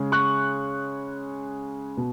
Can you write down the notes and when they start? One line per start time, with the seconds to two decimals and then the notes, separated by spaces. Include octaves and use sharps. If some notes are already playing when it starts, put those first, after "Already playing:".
Already playing: C#3 G#3
0.12 C#6 F#6
1.97 B2